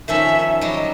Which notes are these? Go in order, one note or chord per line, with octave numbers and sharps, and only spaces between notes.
D#3 F3 C#4 E5
F#3 G3 D#5